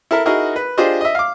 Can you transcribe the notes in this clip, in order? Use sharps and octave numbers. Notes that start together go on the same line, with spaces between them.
E4 A4 A#4 E5
D#4 E4 F#4 G#4 A#4 D#5
B4
D4 F4 G4 G#4 C5 D#5
D#5 E5
F5 D6